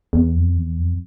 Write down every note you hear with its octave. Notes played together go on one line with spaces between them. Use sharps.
E2
F2
E2
F2